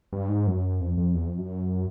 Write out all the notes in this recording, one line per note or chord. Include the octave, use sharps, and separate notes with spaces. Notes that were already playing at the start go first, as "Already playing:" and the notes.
G2
G#2
F#2
F2
F2
E2
F2
F#2